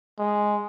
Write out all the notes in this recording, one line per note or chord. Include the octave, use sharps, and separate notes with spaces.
G#3